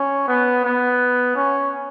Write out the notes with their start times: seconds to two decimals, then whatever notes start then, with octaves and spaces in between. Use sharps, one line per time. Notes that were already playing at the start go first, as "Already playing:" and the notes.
Already playing: C#4
0.28 B3
0.65 B3
1.36 C#4